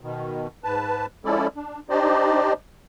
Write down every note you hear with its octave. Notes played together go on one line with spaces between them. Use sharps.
B2 D#3
G#2 B4 A5
F3 G#3 C#4 E4 A4 D5
D4
D4 D#4 G4 C5 D5 D#5